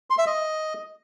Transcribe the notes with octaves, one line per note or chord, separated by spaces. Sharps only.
C6
E5
D#5